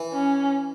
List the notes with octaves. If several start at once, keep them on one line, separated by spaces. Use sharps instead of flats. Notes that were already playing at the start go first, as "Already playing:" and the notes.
Already playing: E3
C#4